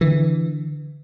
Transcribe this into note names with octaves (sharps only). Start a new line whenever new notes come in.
D3 E3